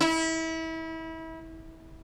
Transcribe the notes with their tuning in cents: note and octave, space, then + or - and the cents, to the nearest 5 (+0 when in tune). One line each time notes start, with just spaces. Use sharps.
E4 -30